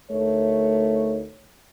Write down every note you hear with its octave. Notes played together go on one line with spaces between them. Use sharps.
D2 A3 D#4 A#4 C#5